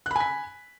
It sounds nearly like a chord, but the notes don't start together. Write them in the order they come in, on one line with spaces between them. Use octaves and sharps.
F#6 B5 G#5 B6